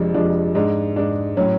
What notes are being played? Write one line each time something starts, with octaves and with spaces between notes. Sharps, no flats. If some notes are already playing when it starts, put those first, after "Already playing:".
Already playing: F1 F2 F3 G#3 D4
F1 F2 F3 G#3 D4
G#2 G#3 D4
G#2 G#3 D4
A2 F#3 C#4